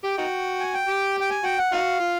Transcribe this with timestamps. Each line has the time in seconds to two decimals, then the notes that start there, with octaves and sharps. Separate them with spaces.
0.04 G4 G5
0.18 D#4 F#4
0.60 G#5
0.74 G5
0.87 G4
1.20 G5
1.30 G#5
1.44 F#4 G5
1.58 F#5
1.72 D#4 F#4 F5
2.00 F4